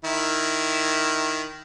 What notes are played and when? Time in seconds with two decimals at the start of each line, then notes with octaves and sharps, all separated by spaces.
0.05 D#3 E4